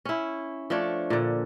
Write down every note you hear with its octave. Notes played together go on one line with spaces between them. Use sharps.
C#4 E4
F3 A3 D4 C#5
A#2 D3